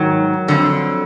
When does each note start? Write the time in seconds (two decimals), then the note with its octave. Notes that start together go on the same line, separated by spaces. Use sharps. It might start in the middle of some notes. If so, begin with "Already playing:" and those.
Already playing: G#2 D#3 F#3
0.48 F2 D3